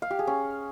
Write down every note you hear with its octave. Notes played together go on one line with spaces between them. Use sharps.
F5
G4
G#4
C#4